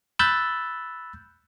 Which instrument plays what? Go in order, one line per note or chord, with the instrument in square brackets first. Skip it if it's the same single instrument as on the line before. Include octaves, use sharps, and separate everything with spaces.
[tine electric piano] B5 E6 F#6 G6 A6